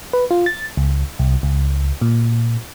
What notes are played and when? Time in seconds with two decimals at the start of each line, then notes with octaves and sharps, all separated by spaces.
0.13 B4
0.31 F4
0.46 A6
0.77 C#2
1.19 C2
1.43 C#2
2.01 A#2